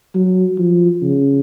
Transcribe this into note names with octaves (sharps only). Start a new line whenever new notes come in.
F#3
F3
C#3